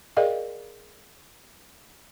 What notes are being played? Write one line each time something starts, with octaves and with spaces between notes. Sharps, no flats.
G#4 A#4 D5 D#5 F5 G5